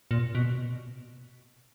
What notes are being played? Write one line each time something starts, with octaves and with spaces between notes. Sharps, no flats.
A#2
B2